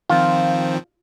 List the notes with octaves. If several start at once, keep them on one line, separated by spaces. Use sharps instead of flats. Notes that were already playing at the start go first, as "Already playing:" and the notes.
D#3 F3 C4 F4